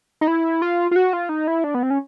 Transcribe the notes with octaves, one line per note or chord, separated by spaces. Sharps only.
D#4
E4
F4
F4
F#4
F4
D#4
E4
D4
B3
C4
C#4